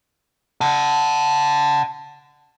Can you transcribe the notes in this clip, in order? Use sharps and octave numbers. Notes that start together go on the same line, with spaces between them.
F#5 A5